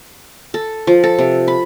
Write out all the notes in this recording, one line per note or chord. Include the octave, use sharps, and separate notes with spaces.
A4
F3
A4
C3
B5